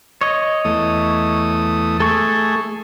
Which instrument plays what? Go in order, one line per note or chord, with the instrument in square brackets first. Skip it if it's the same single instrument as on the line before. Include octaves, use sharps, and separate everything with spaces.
[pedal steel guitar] C#5 D#5
[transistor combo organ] E2 A3 D#6
[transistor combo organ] A3 G#4 [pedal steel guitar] A4 C#6